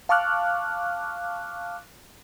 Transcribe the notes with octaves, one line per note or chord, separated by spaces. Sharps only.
F5 A5 C#6 D6 F6 F#6